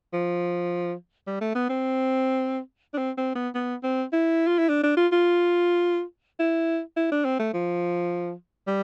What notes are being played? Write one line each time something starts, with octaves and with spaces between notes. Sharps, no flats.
F3
G3
A3
B3
C4
D4
C4
C4
B3
B3
C4
E4
F4
E4
D4
D4
F4
F4
E4
E4
D4
C4
A3
F3
G3